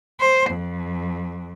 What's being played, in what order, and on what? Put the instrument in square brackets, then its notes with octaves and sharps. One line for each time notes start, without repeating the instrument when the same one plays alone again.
[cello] C5
F2